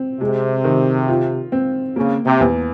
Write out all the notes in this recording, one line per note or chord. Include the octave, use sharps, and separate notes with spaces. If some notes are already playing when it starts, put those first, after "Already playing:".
Already playing: C4
C3 G#3
D#3
F4
C4
C#3 A#3
C3
E2